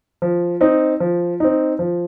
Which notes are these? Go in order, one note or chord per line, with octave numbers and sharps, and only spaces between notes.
F3
C4 D#4
F3
C4 D#4
F3